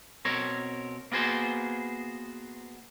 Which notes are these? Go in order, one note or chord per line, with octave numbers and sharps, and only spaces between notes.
B2 C4 A#4 C#5
A#3 B3 F#4 G#4 C5